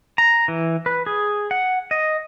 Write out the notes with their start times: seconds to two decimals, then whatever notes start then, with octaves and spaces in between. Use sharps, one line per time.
0.18 A#5
0.48 E3
0.86 B4
1.06 G#4
1.51 F#5
1.91 D#5